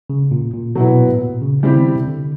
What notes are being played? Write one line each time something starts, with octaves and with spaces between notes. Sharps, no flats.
C#3
A#2
A#2
B2 F#3 B3 E4
B2
A#2
A2
A#2
C#3
C#3 G3 C4 E4 G4
D#3
C#3
C3
D3